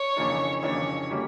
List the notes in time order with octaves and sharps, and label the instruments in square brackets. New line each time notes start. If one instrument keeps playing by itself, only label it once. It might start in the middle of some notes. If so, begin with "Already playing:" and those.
Already playing: [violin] C#5
[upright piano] F2 C#3 E3 A#3 D4
[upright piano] F2 C#3 E3 A#3 D4 [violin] C#5
[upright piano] D3 G3 A#3 C#4 G4